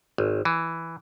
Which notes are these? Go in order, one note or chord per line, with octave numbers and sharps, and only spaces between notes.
G#1
E3